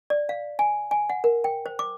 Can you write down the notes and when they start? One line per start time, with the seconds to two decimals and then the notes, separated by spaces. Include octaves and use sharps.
0.10 D5
0.29 F5
0.59 G#5
0.91 G#5
1.10 F#5
1.24 A#4
1.44 G5
1.66 C5
1.79 D6